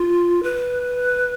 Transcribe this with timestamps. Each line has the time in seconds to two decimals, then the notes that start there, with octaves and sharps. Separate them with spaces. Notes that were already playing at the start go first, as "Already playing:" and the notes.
Already playing: F4
0.43 B4